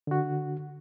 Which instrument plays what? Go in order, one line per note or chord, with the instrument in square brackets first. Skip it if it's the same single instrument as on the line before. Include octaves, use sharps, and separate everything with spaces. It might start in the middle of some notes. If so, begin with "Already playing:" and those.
[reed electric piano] D3 F#4